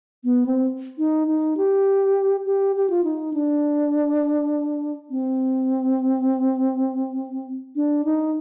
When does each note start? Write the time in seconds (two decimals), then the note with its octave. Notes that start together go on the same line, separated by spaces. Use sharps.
0.24 B3
0.46 C4
0.98 D#4
1.28 D#4
1.57 G4
2.46 G4
2.76 G4
2.90 F4
3.04 D#4
3.34 D4
5.10 C4
7.76 D4
8.05 D#4